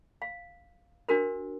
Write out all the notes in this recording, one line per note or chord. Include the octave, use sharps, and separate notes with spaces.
F5
D4 F#4 A#4 C5